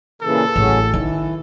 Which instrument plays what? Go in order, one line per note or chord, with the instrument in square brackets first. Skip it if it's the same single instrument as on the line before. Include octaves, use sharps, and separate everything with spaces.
[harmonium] A#2 C#3 E3 [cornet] A4
[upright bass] A1 [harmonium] C#3 F#3 C#4
[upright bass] D#3 [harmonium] E3